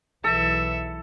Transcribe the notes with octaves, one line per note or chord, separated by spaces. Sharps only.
B1 E3 A4 E5